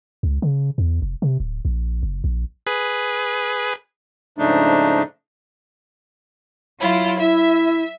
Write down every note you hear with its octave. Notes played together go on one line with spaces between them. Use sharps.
C#2
C#3
E2
F1
C3
D1
A#1
F#1
A#1
G#4 B4
G#2 C#3 F3 A3 D4 D#4
F#3 E4 F4
E4 E5